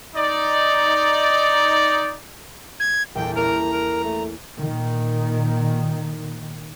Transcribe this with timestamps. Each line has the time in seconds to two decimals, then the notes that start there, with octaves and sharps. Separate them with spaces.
0.15 D#4 D5
2.80 G#6
3.15 A#1 E2 A4 G5
3.36 A#3 C#4 A4 A#4 A#5
3.72 A#4
4.04 A3
4.59 A#2 D#3